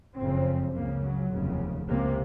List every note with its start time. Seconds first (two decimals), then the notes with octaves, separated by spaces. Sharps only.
0.17 F#1 F2 C#3 C4
0.74 C#2 C#3 A#3
1.03 F#3
1.31 F1 D#2 C#3
1.88 C#2 C3 A#3